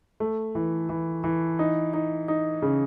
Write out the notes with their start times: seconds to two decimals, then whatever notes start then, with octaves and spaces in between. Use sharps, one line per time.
0.20 A3
0.55 E3
0.89 E3
1.24 E3
1.59 D#4
1.94 D#4
2.28 D#4
2.62 C#3